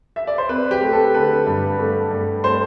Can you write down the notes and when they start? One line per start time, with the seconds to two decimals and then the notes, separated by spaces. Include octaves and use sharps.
0.16 E5
0.27 D5
0.38 C5
0.49 C4 B4
0.71 G4
0.82 A3
0.93 A4
1.14 D3 B4
1.47 G2
1.79 A3
2.11 G2
2.44 A3 C5